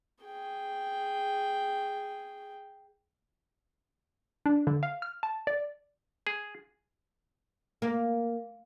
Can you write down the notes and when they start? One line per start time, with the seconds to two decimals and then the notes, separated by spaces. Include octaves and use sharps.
0.24 G#4 G5
4.46 D4
4.67 D3
4.83 F5
5.02 F6
5.23 A5
5.47 D5
6.27 G#4
7.82 A#3